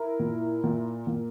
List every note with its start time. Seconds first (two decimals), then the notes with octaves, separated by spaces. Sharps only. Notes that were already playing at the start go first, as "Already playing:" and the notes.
Already playing: E4 A#4
0.19 A#2
0.64 A#2
1.07 A#2